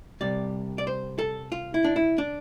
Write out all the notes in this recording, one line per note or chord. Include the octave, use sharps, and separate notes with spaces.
C2 C3 G3 D5
D5
C5
A4
F4
E4
D4
E4
D4